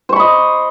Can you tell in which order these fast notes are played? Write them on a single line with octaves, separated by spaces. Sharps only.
C5 C#6 B5 D#5